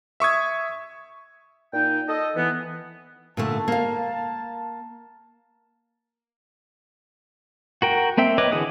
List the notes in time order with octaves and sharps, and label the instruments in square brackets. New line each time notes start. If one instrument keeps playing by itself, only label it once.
[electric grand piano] E5 C#6 D#6 G#6
[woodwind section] A#2 D#4 G5
A4 D#5
E3 B3
[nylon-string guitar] A#2 D3 A3 [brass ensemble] A5
[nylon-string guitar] A#3 F5
[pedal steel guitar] F#4 A#4 G5
A#3 C4 E5 G5
B4 C#5 D#5 D6
D3 E3 F#4 G#4 D#6